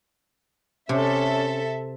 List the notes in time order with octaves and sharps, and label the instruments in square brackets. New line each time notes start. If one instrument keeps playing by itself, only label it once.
[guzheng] C3 [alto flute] C#4 [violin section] A4 E5